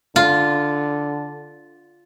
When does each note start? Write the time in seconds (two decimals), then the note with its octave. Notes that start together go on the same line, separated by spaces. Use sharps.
0.16 D3 F4